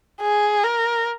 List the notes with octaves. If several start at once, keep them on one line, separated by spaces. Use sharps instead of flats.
G#4
A#4